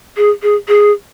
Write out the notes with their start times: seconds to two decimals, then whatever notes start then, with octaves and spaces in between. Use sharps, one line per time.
0.17 G#4
0.42 G#4
0.68 G#4